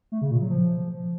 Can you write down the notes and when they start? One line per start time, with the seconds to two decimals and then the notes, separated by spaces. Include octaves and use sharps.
0.12 A3
0.21 C#3
0.31 A#2
0.41 F#3
0.50 F3